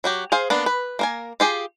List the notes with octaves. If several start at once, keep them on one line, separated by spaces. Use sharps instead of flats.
F#3 F#4 G4
G#4 C5 F5
A#3 B3 D4
B4
A#3 A#4 G#5
F4 G4 G#4